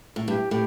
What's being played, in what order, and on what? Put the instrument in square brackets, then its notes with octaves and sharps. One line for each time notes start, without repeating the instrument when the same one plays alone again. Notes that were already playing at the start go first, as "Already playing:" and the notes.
[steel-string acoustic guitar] A2
[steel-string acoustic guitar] G2 [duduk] G4
[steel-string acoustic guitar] A2 [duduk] G4